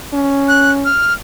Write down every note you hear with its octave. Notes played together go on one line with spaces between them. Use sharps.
C#4
F#6
F6